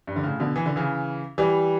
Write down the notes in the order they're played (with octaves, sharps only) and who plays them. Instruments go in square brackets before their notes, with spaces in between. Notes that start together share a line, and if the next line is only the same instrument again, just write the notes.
[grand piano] G2
D3
A2 C#3
B2 D3
E3
D3
C#3 E3
E3 G3